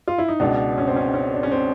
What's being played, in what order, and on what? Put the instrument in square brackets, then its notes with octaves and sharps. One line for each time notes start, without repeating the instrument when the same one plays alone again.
[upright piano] F4
E4
D#4
C#2 B2 D4
C#4
C4
C#4
C#4
D4
C#4
C4